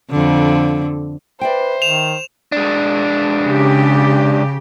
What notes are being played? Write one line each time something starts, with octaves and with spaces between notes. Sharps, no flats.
F2 D3
B4 C5 D5 E5 G5
D#3 E7 F7
G#3 D4
C#3 G4